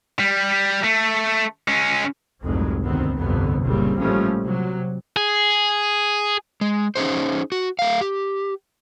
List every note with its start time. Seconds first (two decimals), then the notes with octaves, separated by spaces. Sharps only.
0.19 G3
0.84 A3
1.68 G#3 C#4
2.41 F1 C2 F2 G#2 F#3 G#3
2.83 G1 D2 D#3 B3 C4
3.18 G1 C2 F2 B2 D3 B3
3.63 F#1 A#2 C#3 G3 C4
3.97 A1 A#2 F3 G3 A3 C#4
4.42 C3 F#3
5.17 G#4
6.61 G#3
6.96 C#4 D#4 G#4 C5
7.52 F#4
7.79 A3 F5
8.01 G4